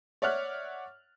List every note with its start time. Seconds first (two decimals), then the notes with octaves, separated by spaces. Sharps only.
0.22 C#5 D5 E5 F#5 F6 F#6